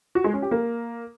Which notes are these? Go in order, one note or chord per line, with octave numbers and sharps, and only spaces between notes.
F#4
G#3
C#4
G4
A#3